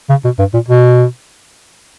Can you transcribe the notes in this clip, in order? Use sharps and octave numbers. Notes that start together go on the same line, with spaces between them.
C#3
B2
G2
A#2
B2